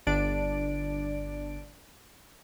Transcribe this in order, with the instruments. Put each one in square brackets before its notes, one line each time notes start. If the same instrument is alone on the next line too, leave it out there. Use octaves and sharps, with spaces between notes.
[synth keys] G1 D4 D5 D7